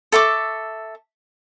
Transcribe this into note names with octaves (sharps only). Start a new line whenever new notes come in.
A4 E5 C#6 D6